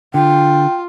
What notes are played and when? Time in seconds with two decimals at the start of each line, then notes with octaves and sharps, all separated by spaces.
0.14 D3 F4 G5